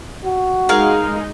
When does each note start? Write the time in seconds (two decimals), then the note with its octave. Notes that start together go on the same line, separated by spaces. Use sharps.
0.25 F#4
0.69 G#3 D#4 G#4 A#4 F5